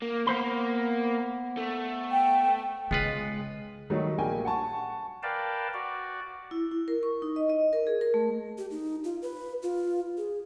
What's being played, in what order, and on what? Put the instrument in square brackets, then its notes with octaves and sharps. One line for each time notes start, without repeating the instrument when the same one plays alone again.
[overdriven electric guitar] A#3
[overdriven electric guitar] A#3 [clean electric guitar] B3 C5 B5
[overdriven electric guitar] A3
[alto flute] G5
[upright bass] C#3 [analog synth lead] G#3 [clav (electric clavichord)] B3 F4 B4
[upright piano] D#3 F#3 G3 A3
A#1 A#3 G5 G#5
F#5 G#5 A5 C#6
[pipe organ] A#4 B4 D5 F5 G5 A5
F#4 D5
[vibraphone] E4
E4
A#4
C#6
D#4
D#5
D#5
A#4
G#4
A#4
A3
[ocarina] G4
D#4
F4
B4
F4
G#4